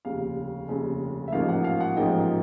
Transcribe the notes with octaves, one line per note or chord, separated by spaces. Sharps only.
F1 D#2 C#3 F5
F1 D#2 C#3
E5
A1 G#2 F3 A#3 D#4 F5
F#5
F5
F#5
A1 G#2 F3 A#3 D#4 G5